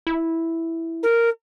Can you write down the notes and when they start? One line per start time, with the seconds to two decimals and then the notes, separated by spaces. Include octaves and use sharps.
0.07 E4
1.03 A#4